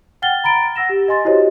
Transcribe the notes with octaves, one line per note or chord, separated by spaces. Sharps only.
F#5 G5 F6 A6 G7
A#5 B5 A6 D7 G7
F#5 E6 A#6 E7
G4
D#5 G#5 C6 A6
E4 F#4 G4 C5 C#5 D#5